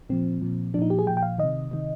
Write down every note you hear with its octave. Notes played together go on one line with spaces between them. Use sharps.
A#2 F3 C4
A#2 F3
A#2 F3 D4 D#4
G4
G#4
A#2 F3 G5
G5
F5
C3 D#3 D#5
C3 D#3